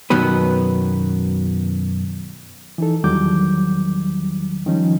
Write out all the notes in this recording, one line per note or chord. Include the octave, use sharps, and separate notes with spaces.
F#2 B2 D#3 F#3 B3 B4
E3 D#4 A4
E2 D#3 F#3 G3 D6 G6
D#3 F3 G3 C#4 D#4